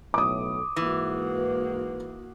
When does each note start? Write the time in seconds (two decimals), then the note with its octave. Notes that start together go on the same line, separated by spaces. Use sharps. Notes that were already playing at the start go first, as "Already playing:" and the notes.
0.14 B1 A2 D6 D#6
0.76 G#2 E3 A#3 F#4 B4